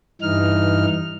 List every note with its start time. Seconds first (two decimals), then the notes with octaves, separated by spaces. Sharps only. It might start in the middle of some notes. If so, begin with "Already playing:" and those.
0.22 G2 E3 D#4 F6